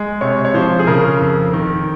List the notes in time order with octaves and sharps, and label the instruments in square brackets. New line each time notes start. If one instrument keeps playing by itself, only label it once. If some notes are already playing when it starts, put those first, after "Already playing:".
Already playing: [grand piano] G#3
C3 C#5
C#5
F3 C5
G#4
C#3 A#4
F2
D#3